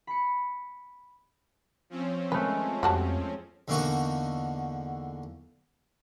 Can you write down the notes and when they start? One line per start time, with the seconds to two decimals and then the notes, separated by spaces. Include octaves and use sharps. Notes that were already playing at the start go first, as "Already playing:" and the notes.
0.07 B5 C#7
1.90 F3 C4 C#4
2.32 G#3 A3 B4
2.83 F2 G3 F#4 A5
3.68 E2 D3 A#3 D#4 F#4 A#5